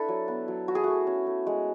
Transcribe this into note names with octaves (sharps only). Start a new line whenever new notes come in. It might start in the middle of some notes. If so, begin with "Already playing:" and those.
Already playing: D4 E4 A4 B4
F#3
B3
F#3
E4 F#4
G#4
A3 F#4
C#4
A3
G#3